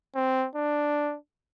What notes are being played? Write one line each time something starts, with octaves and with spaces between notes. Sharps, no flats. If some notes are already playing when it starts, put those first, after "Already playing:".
C4
D4